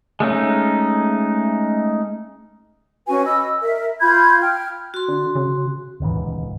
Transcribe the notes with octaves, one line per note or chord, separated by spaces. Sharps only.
G#3 A3 C#4 D#4
C#4 F#4 B4 G#5
D#5 B5 E6
A#4 E5
F4 B5 G6 G#6
G5 F6
F#4 C6
D3
C#3
D#1 C#2 G#2 E3